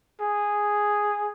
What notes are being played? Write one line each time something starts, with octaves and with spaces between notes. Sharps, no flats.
G#4